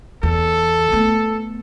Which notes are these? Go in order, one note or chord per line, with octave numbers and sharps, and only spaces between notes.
E2 A4
A3 B3